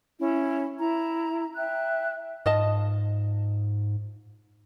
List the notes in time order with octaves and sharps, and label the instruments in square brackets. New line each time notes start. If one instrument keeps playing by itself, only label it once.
[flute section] C#4 E4
E4 A#5
E5 G5 F#6
[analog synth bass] G#2 [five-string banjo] F4 D#5 A5